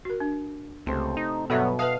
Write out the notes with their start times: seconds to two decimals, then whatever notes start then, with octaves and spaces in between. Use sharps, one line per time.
0.05 F#4 A#4
0.20 D4
0.86 C#2 C3 A3 C4
1.17 D#4
1.50 G2 B2 F#3 B3 A4 E5
1.79 B4 E5 F5 A5 D#6